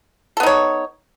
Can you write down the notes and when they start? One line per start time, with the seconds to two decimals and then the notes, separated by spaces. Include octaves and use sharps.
0.37 A4
0.40 B3
0.43 D#4
0.46 C#5